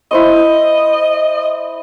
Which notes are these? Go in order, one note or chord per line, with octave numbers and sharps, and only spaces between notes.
E4 C5 D#5 C#6